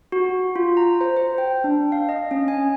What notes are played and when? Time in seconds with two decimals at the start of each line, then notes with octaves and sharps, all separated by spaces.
0.12 F#4
0.56 F4
0.77 A#5
1.01 C5
1.17 C5
1.38 G5
1.64 D4
1.92 F5
2.09 D#5
2.31 C#4
2.48 G#5